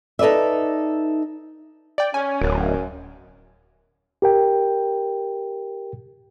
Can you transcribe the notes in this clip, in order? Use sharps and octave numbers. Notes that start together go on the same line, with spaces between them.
D#4 A4 B4 D5 E5
D5 G5
C#4 G#5
D1 F#2
G4 A#4 G5